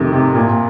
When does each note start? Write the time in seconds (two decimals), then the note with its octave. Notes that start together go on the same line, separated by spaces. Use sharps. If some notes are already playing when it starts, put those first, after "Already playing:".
Already playing: F2 C3 D#3 A3
0.13 C3
0.35 A#2